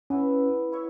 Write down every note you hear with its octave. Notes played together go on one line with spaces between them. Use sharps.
B3 C#4 E4 B4 E5
E4 C#5 E5